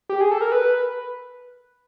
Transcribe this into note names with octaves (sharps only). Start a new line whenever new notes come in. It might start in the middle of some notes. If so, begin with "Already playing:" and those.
G4
G#4
A4
A#4
B4